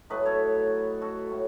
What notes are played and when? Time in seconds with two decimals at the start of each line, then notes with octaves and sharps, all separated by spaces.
0.10 A2 F#3 A3 B4 D#5
0.25 A4 C#5
1.01 F#4 A4
1.32 A2